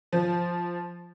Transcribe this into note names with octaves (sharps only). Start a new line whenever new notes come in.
F3